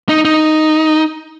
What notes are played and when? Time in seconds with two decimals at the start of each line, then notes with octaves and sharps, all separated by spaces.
0.09 D#4
0.25 D#4